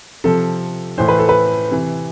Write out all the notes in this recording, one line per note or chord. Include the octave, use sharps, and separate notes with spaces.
C3 F3 A4
A2 E3 C5
B4
A4
B4
C3 E3